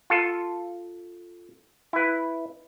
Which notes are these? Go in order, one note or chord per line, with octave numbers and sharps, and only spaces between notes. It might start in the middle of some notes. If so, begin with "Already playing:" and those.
F4 A4
E4 B4